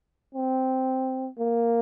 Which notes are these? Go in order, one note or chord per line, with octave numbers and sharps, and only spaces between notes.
C4
A#3